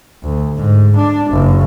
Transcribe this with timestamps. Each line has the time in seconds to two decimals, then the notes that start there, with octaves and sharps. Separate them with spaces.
0.23 D2
0.56 G#2
0.96 D4
1.31 F#1